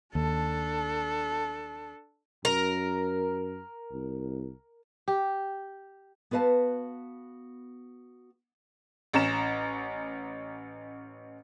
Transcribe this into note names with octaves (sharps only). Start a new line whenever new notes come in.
D#2 D4 A4
F#2 A#4
C2
G4
B3 F#4 B4 F5 A5
A1 C#4 A#5 E7